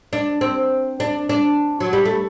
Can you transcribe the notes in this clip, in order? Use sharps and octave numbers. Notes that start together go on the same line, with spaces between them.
D4
C4
D4
D4
F#3
G3
A3